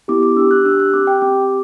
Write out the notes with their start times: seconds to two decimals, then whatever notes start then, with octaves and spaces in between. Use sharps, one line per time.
0.08 B3 E4 G4 D6
0.23 D6
0.36 D4 G4 E6
0.51 F#6
0.65 D4 G4 E6
0.80 F#6
0.94 C4 G4 D6
1.07 G5
1.22 C4 G4 D6